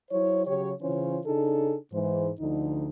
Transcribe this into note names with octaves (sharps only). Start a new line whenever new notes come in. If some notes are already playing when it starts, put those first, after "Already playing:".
F#3 E4 C5 C#5
C#3 F#3 G4 C#5
C#3 E3 C#4 F4 C5 C#5
C#3 D4 D#4 G#4 A4
G#2 E3 C5
D2 D3 F3 D#4